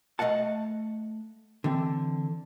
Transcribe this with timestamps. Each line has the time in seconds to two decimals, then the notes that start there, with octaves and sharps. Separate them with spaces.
0.19 A3 D#5 F5 F#5 A5
1.64 D3 E3 C4